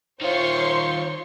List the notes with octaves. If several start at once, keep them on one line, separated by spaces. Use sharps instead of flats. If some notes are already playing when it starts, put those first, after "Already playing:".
D#3 F4 C5 C#5 C6 C#6